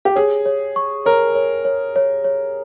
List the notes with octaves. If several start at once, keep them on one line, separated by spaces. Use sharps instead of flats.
G4
G#4 C#5
C#5
C#6
A#4 C#5
C#5
C#5
C#5
C#5